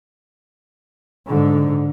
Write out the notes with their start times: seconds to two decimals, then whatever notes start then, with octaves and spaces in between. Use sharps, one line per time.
1.27 G#2 D3